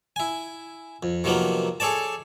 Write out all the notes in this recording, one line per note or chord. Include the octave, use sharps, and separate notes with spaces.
E4 G#5
F2
C3 D#3 F3 F#3 A#3 B3
G#4 A4 C#5 D5 A5